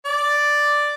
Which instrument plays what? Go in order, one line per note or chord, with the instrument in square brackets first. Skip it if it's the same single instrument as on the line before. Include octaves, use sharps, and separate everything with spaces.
[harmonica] D5